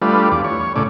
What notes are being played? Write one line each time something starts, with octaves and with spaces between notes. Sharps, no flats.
G3 A3 D4 F4 B4
E2 D5
C#5
A2 C#3 D5